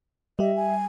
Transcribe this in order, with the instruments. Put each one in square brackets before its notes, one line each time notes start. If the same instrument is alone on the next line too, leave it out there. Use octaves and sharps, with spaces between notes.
[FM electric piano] G3 G4 [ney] D#5 [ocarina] E5
[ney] G#5